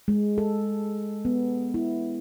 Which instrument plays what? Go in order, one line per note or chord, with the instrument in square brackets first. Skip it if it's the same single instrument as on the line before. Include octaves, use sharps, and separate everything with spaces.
[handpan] G#3
A4
B3
E4